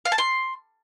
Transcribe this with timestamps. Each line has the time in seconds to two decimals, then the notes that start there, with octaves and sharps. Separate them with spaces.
0.05 F5
0.12 A5
0.18 C6